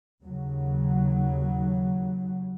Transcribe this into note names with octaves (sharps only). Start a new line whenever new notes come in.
D#2 C#3 F#3